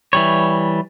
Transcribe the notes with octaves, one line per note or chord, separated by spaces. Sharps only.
E3 G3 C#5